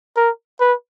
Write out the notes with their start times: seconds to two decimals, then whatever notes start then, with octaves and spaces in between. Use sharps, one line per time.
0.17 A#4
0.60 B4